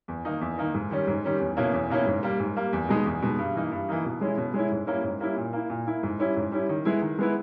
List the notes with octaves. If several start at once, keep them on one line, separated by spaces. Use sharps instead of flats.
E2
D#3 A#3 D#4
E2
D#3 A#3 D#4
G#2
D#3 G3 C#4
G#2
D#3 G3 C#4
E2
B2 A#3 C#4 E4
E2
B2 A#3 C#4 E4
G#2
G3 A#3
G#2
G3 A#3
E2
B2 G#3 D#4
E2
B2 G#3 D#4
G2
E3 A#3 D#4
G2
E3 A#3 D#4
B2
G#3 C#4 E4
B2
G#3 C#4 E4
G#2
G3 A#3 C#4 E4
G#2
G3 A#3 C#4 E4
A#2
A#3 E4
A#2
A#3 E4
G#2
G3 C#4 E4
G#2
G3 C#4 E4
D#3
G#3 B3 E4
D#3
G#3 B3 E4